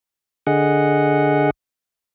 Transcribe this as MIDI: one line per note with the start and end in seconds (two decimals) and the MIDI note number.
0.47 1.50 50
0.47 1.50 68
0.47 1.50 75
0.47 1.50 78